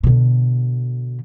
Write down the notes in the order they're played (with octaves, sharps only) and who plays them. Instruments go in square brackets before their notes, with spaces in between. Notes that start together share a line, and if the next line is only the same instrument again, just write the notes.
[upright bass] B2 D3